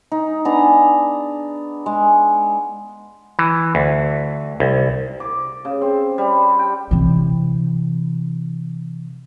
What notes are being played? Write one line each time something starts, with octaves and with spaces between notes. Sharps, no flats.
D#4
B3 D4 G#4 A#5
G#3
E3
D2
C2
D6
C#3
C4
G3
G5
C3 E3